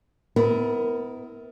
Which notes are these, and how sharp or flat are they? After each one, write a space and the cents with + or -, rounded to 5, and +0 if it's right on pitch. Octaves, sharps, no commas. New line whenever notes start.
B3 +25 E4 -25 A#4 +0